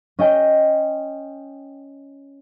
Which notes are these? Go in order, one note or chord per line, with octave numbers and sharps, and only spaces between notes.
C#4 D#5 G5